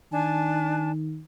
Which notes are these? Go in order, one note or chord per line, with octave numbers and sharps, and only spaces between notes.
D#3 D4 G#5 A5